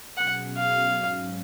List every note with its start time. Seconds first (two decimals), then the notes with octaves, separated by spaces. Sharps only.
0.16 B2 F#3 C#4 G#4 F#5
0.57 F5
0.97 G#2 F#3 C#4